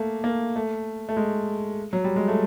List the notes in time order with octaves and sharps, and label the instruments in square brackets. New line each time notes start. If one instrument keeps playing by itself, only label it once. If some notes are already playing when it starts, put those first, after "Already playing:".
Already playing: [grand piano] A3 A#3
A#3
A3
A3
G#3
F#3
G3
G#3
A3